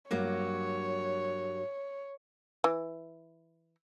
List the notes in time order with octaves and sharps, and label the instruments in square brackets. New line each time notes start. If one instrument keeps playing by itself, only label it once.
[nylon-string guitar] G2 F#3 A#3 [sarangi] C#5
[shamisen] E3